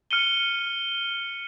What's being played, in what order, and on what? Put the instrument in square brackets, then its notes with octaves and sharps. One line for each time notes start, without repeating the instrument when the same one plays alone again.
[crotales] F6 C#7 D#7 G7